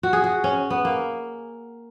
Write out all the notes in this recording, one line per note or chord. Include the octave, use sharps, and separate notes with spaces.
F#4
G#4
F#4
C#4
B3
A#3